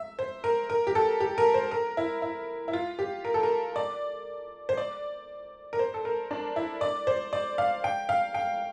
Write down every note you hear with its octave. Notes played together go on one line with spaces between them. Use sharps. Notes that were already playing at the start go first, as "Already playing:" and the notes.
Already playing: E5
C5
A#4
A#4
G4
A4
G4
A#4
C5
A#4
E4
E4
E4
F4
G4
A#4
A4
A#4
D5
C5
D5
A#4
C5
A4
A#4
D4
E4
D5
C5
D5
F5
G5
F5
G5